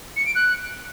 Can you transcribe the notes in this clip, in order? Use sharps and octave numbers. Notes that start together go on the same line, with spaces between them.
C#7
D7
F#6